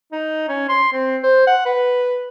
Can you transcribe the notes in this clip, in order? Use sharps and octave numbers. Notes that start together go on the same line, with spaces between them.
D#4
C#4
C6
C4
C5
F#5
B4